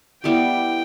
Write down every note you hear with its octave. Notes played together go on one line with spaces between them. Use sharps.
G3 B3 E4 G4 G5